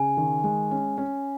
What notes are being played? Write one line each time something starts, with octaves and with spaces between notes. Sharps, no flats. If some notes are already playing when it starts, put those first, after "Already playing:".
Already playing: C#3 G#5
D#3
G#3
C#4
C#4